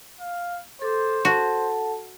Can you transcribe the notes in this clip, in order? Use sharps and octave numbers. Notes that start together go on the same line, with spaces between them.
F5
A4 C5 D6
F#4 A4 F#5 A5